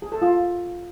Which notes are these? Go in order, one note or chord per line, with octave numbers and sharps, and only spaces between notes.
G#4
A4
F4